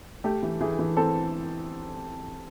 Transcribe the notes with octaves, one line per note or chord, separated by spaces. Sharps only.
A3 G4
E3
E3 G#4
E3
C4 A4